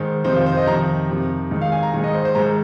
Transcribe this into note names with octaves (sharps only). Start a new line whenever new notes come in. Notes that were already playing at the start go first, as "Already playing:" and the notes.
Already playing: G#2 D#3 C5
F2 C3 D#3 C5
F4
C5
D#5
F2 C3 D#3 A#5
F2 C3 D#3
G#2 D#3
F5
G#5
A#5
G#2 D#3 G#5
D#5
C5
C5
G#2 D#3 A#5